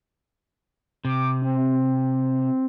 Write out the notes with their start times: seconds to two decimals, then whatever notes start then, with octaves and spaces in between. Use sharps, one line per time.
1.05 C3 D6
1.42 C4